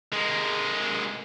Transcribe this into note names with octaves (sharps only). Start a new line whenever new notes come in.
G#3 A#3